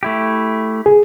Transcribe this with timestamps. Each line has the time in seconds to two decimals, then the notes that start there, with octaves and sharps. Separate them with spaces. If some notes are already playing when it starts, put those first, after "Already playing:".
0.03 A3 E4 G4
0.86 G#4